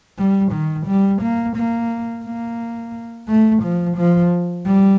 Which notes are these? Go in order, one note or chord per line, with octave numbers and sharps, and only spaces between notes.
G3
D#3
G3
A#3
A#3
A#3
A3
F3
F3
G3